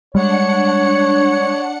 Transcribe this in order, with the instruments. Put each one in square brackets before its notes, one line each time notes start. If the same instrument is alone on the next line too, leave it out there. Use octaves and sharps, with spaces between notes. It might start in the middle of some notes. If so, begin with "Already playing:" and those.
[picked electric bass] G3 G#3 [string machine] D4 F#5 C#7 [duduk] C#5